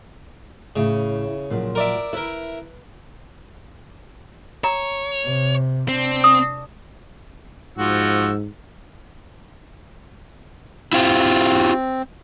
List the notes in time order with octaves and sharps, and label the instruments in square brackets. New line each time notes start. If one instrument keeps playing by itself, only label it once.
[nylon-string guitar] A2 [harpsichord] C#3
[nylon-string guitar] A#2 F3 F#3
[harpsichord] A#4 D5 E5
[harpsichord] E4 A#4 [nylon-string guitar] B4
[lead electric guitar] C#5 [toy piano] A#5
[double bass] C3
[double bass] C3 D4 [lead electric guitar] C4
[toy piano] D#6
[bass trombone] G#2 [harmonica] F3 F#4 E6
[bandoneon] C4 [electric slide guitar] E4 F4 G4